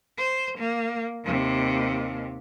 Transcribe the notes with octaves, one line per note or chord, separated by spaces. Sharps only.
C5
A#3
D#2 C3